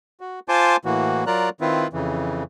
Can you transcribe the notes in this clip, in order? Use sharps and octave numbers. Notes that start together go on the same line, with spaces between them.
F#4
F4 C5 G#5 A5 C6 D6
A2 E3 A#3 F#4
F#3 F4 A#4 D5 A#5 F#6
D#3 C4 E4 F4 B4
F2 C#3 E3